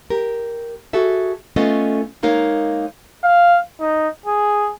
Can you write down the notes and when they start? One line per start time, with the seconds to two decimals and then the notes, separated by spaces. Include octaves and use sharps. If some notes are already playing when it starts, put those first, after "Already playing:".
0.10 G4 A#4
0.93 F#4 G#4 A4 E5
1.56 A3 B3 C#4 F4 A4 D#5
2.23 G#3 A#3 D#4 A#4 C#5 F5
3.24 F5
3.80 D#4
4.26 G#4